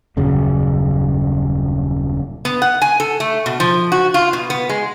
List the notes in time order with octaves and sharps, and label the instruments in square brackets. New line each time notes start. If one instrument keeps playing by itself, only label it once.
[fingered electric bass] D#1 F#2 C#3
[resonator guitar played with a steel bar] B3
F#5
G#5
A4
A3
B2
F3
F#4
F4
B2
B3
G#3